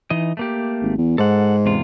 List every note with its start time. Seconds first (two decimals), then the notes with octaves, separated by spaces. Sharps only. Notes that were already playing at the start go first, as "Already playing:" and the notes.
0.10 E3 D#4 D#5
0.37 A3 A#3 G4
0.82 G#1
0.98 E2
1.18 G#2 A4 F#5
1.66 E2 C3 F4